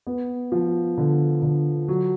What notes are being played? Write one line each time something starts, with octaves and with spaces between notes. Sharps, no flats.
B3
F3
D3
D3
F#3